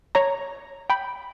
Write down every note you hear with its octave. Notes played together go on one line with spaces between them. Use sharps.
C#5 A#5
G5 B5